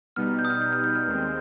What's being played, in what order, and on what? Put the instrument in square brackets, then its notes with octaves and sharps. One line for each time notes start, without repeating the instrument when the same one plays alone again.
[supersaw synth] B2 G3 B3 D#4 [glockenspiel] F6
[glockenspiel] G6
D#6
F6
G6
F6
G6
F6
[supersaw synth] D#2 D#3 G#3 C4